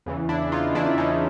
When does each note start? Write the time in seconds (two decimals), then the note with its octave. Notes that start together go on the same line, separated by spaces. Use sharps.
0.06 E2 C#3 E3
0.29 D4 E4
0.52 D#4 F4
0.74 E2 C#3 E3 D4 E4
0.98 C#4 D#4